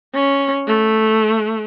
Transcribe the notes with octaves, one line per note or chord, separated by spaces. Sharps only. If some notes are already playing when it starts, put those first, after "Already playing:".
C#4
A3